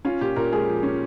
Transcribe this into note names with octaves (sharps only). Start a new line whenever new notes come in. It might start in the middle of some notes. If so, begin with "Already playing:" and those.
C#4 F4
A#2 G4
A#2 A#4
G#3 G#4
F3
C#4